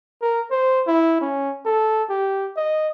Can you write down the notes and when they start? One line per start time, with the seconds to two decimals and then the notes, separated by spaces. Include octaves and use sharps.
0.22 A#4
0.51 C5
0.87 E4
1.21 C#4
1.66 A4
2.09 G4
2.57 D#5